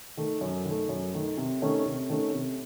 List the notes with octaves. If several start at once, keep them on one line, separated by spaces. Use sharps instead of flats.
D#3 A3
F#2
D#3
A3
F#2
D#3 A3
C3
D#3 A3 C#4
C3
D#3 A3 C#4
C3